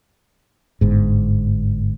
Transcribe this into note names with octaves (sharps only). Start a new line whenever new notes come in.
G1 G#2